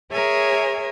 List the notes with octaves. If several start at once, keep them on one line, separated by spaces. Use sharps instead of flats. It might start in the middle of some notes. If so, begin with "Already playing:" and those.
G#4 A#4 C#5 E5 G#5